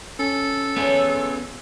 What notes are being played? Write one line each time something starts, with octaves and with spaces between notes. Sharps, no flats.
C#4 A4
F#3 B3 F#4 G#4
F4